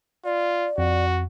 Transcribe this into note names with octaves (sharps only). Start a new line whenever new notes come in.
F4 D5
F2 F#4